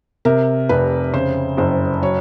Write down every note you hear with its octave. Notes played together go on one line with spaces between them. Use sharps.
C3 A#4
F1 B4
C#3 C5
F#1 C5
F#3 C#5